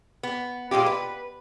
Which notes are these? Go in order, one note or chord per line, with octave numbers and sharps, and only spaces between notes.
B3
A#2 G#3 F4 G4
B4